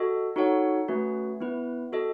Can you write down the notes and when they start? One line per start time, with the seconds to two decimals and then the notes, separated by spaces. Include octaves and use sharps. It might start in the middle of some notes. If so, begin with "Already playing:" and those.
Already playing: F#4 A4 D#5
0.36 D#4 F#4 A4 C#5 F#5
0.88 A3 C#4 F#4 B4
1.40 B3 E4 B4
1.93 F#4 A4 D#5